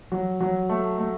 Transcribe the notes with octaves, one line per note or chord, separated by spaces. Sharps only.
F#3
F#3
A3
A3